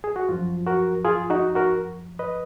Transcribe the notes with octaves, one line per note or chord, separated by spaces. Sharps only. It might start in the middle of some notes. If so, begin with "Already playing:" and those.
G#4
F#4
F#2 F3 F4
F#4 A#4
F4 G#4
D#4 F#4
F#4 A#4
B4 D#5